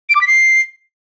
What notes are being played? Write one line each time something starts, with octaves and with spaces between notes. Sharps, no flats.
D7
D6
B6
C7